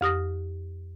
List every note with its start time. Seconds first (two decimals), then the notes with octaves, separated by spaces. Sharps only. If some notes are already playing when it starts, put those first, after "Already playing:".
0.01 F2 G4 D#6 A#6